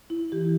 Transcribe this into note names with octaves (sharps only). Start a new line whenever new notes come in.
E4
E3 G4